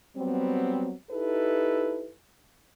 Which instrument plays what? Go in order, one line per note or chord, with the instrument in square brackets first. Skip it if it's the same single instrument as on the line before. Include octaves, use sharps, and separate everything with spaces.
[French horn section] F#3 G3 B3 C4
D#4 E4 G4 A4 B4